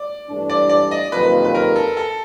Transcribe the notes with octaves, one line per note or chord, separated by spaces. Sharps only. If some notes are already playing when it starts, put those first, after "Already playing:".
Already playing: D5
G2 E3 A3 D4
D5
D5
D#5
F2 C3 D#3 F#3 A#3 B4
B4
A#4
A4
A4